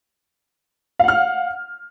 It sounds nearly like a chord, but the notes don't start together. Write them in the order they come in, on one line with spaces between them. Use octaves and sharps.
F5 F#5 F6